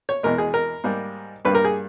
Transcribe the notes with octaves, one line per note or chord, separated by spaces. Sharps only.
C#5
E2 B2 G#3 A#4
G#4
A#4
G#2 G3 A#3
G2 G3 A#3 B4
A#4
G#4